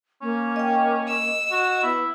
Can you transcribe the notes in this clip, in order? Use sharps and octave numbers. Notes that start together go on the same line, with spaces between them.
A#3 C#4
D#5 G5
D#5 E6
F#4
B3 E4